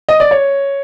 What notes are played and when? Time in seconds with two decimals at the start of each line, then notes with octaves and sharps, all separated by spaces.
0.09 D#5
0.20 D5
0.31 C#5